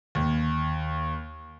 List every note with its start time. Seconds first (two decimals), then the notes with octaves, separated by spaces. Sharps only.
0.15 D#2